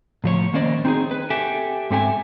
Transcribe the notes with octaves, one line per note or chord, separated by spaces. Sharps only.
A2 F3 C#5
D#3 A#3 C#4 C5 D5 D#5
C4 D#4 G4 G#4
B4
G4 A4 E5 G5 G#5
G#2 C4 G4 A4 E5 G#5